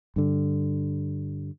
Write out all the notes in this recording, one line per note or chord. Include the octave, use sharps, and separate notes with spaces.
G2 D3